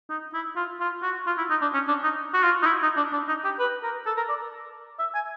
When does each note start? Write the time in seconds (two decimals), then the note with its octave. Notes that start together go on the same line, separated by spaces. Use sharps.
0.10 D#4
0.34 E4
0.56 F4
0.80 F4
1.03 F#4
1.27 F4
1.38 E4
1.50 D#4
1.62 D4
1.74 C#4
1.88 D4
2.04 D#4
2.34 F#4
2.43 F4
2.62 D#4
2.67 E4
2.82 D#4
2.97 D4
3.13 D4
3.28 D#4
3.44 G4
3.59 B4
3.83 A#4
4.06 A4
4.17 A#4
4.29 D5
4.99 E5
5.15 G#5